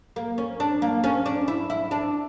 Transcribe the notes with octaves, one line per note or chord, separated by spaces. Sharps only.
A#3
C#4
D4
A#3
C#4
D4
E4
E4
D4